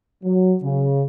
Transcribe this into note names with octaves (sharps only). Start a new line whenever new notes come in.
F#3
C#3